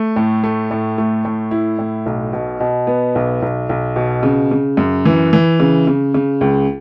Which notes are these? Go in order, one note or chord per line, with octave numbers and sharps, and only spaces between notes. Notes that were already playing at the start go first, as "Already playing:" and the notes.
Already playing: A3
A2
A3
A2
A3
A2
E4
A2
B1
B2
B2
B3
B1
B1
B1
B2
C#3
C#3
F#2
E3
E3
C#3
C#3
C#3
C#2